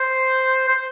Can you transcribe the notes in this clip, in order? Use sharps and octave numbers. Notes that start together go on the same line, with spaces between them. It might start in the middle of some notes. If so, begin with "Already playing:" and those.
Already playing: C5
C5